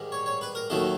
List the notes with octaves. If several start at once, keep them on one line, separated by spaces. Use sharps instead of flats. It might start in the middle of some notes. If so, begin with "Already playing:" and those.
Already playing: G#2 D#3 G3
C#5
C#5
B4
A#4
D#2 D#3 F#3 A3 A4